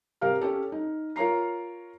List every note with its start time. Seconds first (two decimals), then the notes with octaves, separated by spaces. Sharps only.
0.21 C3 G4 A#4 F5 F6
0.41 C#4 G4 A4
0.72 D#4
1.16 F4 A#4 C#5 A#5 C7